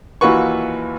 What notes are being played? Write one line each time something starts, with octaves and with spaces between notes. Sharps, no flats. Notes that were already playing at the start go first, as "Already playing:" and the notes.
D#2 E3 F4 F#4 B4 C#6